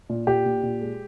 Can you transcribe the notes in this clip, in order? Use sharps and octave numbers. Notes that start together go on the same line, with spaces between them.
A#2
A#2 G4
A#2
A#2
G#3